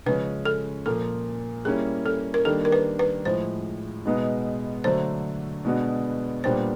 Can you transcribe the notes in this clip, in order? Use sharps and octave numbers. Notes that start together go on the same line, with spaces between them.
C#3 F3 G#3 C#4 B4
A4
A#2 F3 A#3 A4
G3 A#3 C#4 E4 G#4
A4
A#4
D#3 G3 A#3 D4 A4
A#4
B4
B4
A2 F3 G#3 C5
B2 G#3 B3 D#4
D3 F#3 A3 D4 C5
B2 G#3 B3 D4 F#4
A#2 G3 B3 D4 G4 C5